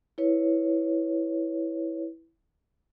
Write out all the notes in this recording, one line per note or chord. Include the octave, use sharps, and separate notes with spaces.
E4 B4 C#5